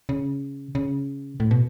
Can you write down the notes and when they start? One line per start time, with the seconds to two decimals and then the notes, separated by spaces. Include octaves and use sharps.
0.09 C#3
0.75 C#3
1.40 A2
1.51 B2